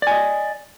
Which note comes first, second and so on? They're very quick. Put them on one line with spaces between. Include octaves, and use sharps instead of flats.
D5 G#5 D#5